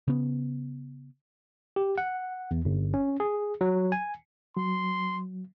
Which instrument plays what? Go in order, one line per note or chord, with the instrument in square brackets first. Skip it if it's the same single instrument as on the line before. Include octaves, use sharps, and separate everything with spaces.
[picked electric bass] C#3 B3
[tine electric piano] G4
F#5
E2
G1
C#4
G#4
F#3
G#5
[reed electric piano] F#3 [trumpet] C6